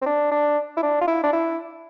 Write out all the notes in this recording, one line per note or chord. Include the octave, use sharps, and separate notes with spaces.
C4
D4
D4
E4
D4
F4
E4
D4
E4